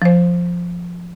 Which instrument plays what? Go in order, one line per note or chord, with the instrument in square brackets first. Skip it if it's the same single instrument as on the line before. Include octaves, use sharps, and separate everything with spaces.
[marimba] F3 C5